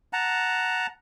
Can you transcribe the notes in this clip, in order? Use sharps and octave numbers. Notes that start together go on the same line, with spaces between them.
F#5 A5 A#5